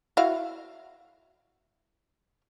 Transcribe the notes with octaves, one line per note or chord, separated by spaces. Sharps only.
E4 F#4 F5